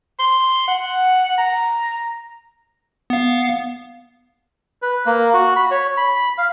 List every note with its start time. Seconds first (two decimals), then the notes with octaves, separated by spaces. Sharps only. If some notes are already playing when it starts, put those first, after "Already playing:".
0.19 C6
0.68 F#5
1.38 A#5
3.10 B3 F5
4.82 B4
5.06 A#3
5.34 F#4
5.56 B5
5.71 C#5
5.97 B5
6.38 F5